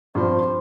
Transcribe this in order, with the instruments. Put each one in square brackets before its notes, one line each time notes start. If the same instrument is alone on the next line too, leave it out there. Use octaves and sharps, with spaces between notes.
[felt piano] G2 F3 C4 [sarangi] C5